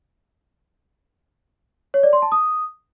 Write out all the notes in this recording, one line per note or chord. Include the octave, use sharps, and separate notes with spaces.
C#5
D5
C6
A5
D#6